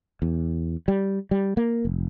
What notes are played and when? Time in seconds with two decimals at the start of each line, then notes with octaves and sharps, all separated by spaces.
0.22 E2
0.88 G3
1.31 G3
1.57 A#3
1.85 F1